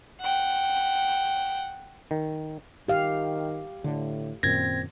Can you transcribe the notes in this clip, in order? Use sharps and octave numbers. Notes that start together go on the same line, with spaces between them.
F#5 G5
D#3
D#3 G4 F5
A2 D3
F#2 A#2 D#3 C4 G#6 A#6